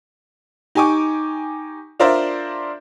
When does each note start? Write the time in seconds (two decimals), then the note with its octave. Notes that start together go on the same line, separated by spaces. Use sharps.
0.75 D#4 G4 G#5 C#6 D6
2.00 D4 F4 A#4 C5 D5 E5